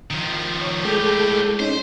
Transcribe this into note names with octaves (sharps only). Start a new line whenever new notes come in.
D#3 F3
C#5
A2 G#3 G4 A4 G6
C#4 D#4 C5